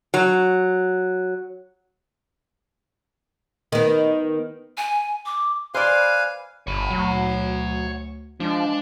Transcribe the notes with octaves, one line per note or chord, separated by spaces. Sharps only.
F#3
D#3 B3
G#5
D6
B4 C5 D5 F5 G#5
G1 C#5 B5
D2 F#3
F3 G#3 D4